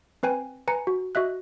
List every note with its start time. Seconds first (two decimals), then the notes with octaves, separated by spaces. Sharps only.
0.23 C4 B4 G5 G#5
0.68 B4 G#5 A#5 C#7
0.87 F#4
1.15 F#4 D#5 E5 F#6